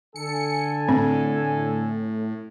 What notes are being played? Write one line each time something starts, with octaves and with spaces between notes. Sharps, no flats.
D3 A4 G#5 C#7
A2 C4